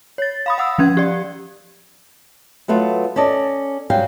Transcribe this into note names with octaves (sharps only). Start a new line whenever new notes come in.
C#5 A6
F5 B5 D#6
F5 F#5 D#6 E6
F3 C#4 G#6
G4 D5
F#3 A3 B3 F4
C#4 A4 D5 D#5
G#2 F#3 G3 F5 G5